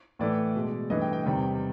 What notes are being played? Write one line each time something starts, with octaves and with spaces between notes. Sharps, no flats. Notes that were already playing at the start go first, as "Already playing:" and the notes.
A2 E3 A3 D5
B2 G#3
G2 E3 A3 D#5
G5
G5
E2 C3 D#3 G3